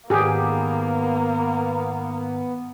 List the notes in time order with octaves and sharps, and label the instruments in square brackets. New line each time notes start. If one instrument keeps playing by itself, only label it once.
[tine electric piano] G#2 D#3 [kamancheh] A#3 [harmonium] B3 [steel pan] G4 G#4